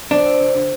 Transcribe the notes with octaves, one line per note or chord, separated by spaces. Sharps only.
F3 D4
C4
D3
D3